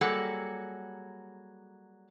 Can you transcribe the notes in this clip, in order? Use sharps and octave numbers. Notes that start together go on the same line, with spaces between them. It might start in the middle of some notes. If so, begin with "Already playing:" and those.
F#3 G3 A#3 G#4 A4 F#5